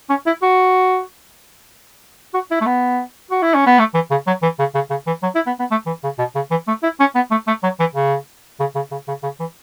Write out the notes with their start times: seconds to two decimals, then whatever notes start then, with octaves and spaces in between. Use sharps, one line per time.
0.09 C#4
0.26 E4
0.42 F#4
2.34 F#4
2.51 E4
2.61 A3
2.66 B3
3.30 F#4
3.42 E4
3.54 C#4
3.66 B3
3.79 A3
3.94 E3
4.10 C#3
4.27 F#3
4.42 E3
4.59 C#3
4.75 C#3
4.90 C#3
5.07 E3
5.22 F#3
5.35 E4
5.46 B3
5.59 B3
5.71 A3
5.86 E3
6.03 C#3
6.18 B2
6.35 C#3
6.51 E3
6.67 A3
6.83 E4
6.99 C#4
7.15 B3
7.31 A3
7.47 A3
7.63 F#3
7.79 E3
7.95 C#3
8.60 C#3
8.75 C#3
8.91 C#3
9.08 C#3
9.23 C#3
9.40 E3